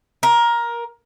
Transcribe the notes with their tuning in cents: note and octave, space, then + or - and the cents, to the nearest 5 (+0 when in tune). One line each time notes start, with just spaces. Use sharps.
A#4 +15